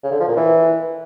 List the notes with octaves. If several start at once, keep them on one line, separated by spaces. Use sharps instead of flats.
C#3
D3
F3
A#2
E3